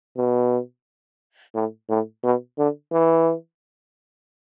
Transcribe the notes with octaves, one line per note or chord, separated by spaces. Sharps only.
B2
A2
A2
B2
D3
E3